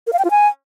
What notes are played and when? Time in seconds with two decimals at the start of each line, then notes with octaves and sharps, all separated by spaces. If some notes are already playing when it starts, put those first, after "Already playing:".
0.07 A#4
0.13 F5
0.19 G5
0.25 F4
0.30 G#5